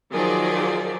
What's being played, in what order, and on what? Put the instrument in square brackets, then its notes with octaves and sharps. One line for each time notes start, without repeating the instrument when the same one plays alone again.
[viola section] D#3 F3 F#3 D#4 G#4 D5